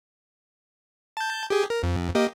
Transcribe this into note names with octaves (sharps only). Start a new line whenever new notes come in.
A5 G6
G4 G#4
A#4
F2
A#3 G4 D#5